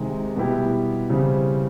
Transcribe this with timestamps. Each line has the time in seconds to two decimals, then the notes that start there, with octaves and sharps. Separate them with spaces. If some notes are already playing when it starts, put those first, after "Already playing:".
Already playing: C3 D#3 G#3
0.36 B2 G3 B3 E4 G4
1.10 C#3 E3 G3 C4